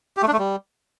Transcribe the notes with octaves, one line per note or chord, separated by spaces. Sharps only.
G4
A3
D4
A3
G3